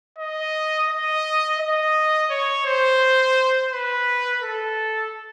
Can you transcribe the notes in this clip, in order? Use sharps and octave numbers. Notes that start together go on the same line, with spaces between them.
D#5
D#5
D#5
C#5
C5
B4
A4